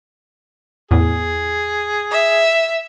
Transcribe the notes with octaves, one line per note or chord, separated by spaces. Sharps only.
E2 A2 G#4
E5